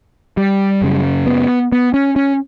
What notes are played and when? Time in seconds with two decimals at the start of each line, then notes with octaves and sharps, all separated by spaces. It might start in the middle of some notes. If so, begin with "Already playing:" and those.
0.37 G3
0.82 F#2 C#3
1.27 B3
1.72 B3
1.94 C#4
2.16 C#4